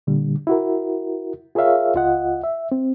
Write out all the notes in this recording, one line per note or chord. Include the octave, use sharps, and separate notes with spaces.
A#2 D3 G3
E4 F#4 A#4
F4 G#4 A#4 C#5 E5 F5
C#2 F4 D#5 F#5
E5
C4